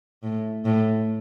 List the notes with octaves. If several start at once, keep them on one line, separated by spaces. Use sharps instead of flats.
A2
A2